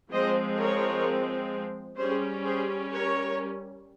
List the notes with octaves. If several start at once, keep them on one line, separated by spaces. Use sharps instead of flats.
F3 G#3 C4 C5 D#5
A#4 C#5
G3 C#4 G#4 C5
G#4 C5
A#4 C#5